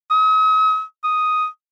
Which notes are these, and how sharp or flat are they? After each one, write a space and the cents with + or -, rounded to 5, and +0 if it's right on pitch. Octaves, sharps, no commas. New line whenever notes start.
D#6 +45
D#6 +5